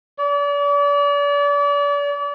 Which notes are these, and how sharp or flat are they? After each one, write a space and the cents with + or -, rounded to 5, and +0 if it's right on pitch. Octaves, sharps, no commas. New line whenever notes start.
D5 -40